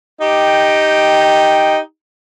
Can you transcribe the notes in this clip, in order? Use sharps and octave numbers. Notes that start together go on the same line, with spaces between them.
D#4 G4 G5